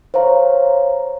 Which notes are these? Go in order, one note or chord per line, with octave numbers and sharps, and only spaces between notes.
C5 C#5 F5 A#5